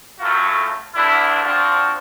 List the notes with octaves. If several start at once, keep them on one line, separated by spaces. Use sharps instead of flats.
F#2 A2 A3 F4 F#4
E2 D3 D4 E4
F3 C4 D4 F4 F#4